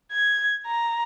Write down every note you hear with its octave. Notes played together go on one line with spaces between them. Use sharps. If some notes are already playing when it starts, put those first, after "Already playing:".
G#6
A#5